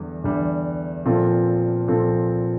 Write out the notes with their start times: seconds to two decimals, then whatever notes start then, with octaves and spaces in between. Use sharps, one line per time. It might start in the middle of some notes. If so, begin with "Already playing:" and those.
Already playing: E2 D3 G3
0.24 E2 D3 G3 D4
1.05 A#2 F3 C4 F4 A4
1.88 A#2 F3 C4 F4 A4